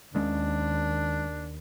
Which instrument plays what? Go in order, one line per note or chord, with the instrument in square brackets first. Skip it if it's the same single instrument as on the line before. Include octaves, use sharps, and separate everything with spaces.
[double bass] D#2 [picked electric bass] D#3 G#3 C#4 [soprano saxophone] D4